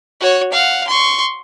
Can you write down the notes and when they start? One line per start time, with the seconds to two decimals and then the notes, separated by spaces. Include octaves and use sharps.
0.21 F#4 C#5
0.52 F5 F#5
0.88 C6 C#6